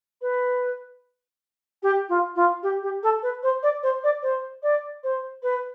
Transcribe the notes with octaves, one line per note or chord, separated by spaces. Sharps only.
B4
G4
F4
F4
G4
G4
A4
B4
C5
D5
C5
D5
C5
D5
C5
B4